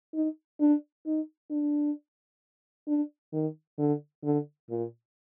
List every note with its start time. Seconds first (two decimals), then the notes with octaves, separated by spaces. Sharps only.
0.14 D#4
0.60 D4
1.06 D#4
1.51 D4
2.87 D4
3.33 D#3
3.79 D3
4.24 D3
4.70 A#2